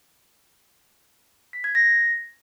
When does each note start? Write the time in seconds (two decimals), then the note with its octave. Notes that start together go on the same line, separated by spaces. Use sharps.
1.53 B6
1.64 G#6
1.75 A#6